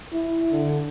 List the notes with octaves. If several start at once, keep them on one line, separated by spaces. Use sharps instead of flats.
E4
D3